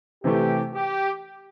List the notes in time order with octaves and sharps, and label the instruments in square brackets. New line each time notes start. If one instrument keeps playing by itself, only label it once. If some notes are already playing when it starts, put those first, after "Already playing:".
[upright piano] C3 E3 A3 [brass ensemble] G4
[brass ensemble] G4